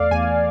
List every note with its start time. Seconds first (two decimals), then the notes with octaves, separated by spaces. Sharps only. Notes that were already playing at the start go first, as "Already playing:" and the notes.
Already playing: E2 A3 D5 F5
0.11 E2 G#5